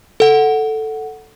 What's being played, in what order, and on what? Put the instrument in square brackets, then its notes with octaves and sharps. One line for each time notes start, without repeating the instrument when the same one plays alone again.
[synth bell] A4 F#5